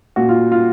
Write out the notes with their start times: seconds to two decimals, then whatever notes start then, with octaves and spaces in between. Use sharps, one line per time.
0.16 A#2 F#4
0.29 F4
0.52 F4